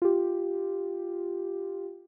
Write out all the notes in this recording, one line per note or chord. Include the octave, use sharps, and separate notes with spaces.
F4 G4